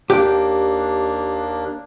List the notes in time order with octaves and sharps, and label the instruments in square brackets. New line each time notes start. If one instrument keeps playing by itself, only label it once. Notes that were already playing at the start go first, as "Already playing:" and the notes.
[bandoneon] D#2 A#3 D4 [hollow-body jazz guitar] G4 G5